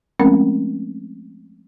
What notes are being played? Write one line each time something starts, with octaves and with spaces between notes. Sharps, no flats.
F3 G#3 A3 C4 C#4 A#4